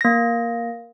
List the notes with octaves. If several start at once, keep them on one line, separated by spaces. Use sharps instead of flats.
A#3 A#6